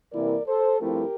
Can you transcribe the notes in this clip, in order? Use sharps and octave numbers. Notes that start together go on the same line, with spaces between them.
C2 C3 E3 A#3 E4 A#4 D5
A4 C5
G2 F3 A3 C4 E4 G4 A#4